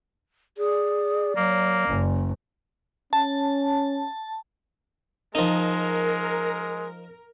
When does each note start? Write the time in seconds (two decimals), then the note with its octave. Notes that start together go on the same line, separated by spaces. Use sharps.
0.58 G#4 D5
1.37 F#3 A#3
1.87 F#1 C#4
3.13 C#4 A5
5.35 F3 G#3 D#4 A#4